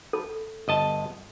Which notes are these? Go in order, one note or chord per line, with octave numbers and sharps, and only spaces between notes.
A4
G1 D#5 A5